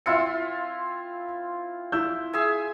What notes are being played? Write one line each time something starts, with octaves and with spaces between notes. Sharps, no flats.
C4 E4 F4 E5 E6 C#7
E4 E6 G6
G#4 E5 G#5